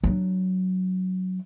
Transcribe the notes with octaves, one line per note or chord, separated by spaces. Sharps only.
F#3 D4